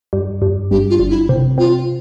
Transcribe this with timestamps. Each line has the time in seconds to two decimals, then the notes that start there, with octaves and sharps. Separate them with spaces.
0.13 G2
0.42 G2
0.71 G1 G4
0.90 F4
1.00 G1
1.10 E4
1.29 C3
1.58 C3 F4